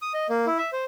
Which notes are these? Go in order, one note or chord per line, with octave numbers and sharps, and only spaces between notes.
D#6
D#5
A#3
E4
E5
C5